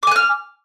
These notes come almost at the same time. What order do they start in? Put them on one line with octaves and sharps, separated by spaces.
D6 G#5 F#6 F6